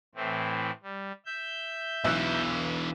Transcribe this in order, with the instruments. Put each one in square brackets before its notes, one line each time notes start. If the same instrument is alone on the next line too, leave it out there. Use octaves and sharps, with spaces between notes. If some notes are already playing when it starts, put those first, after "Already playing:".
[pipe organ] A2 E3 C4
G3
E5 G6
[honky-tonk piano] B1 E6 F#6 [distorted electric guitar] B2 E3